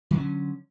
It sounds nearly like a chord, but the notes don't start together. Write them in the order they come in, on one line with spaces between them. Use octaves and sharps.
D#3 F#3 C#4 D3